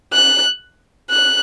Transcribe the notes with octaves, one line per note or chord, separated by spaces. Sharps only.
F#6
F#6